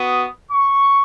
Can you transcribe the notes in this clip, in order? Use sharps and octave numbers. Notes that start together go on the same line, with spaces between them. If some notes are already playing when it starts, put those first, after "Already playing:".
Already playing: B3 F#4 D#6
C#6